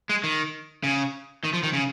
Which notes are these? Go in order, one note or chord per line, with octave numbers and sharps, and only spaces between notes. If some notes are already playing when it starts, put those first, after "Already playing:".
G#3
D#3
C#3
D#3
F3
D#3
C#3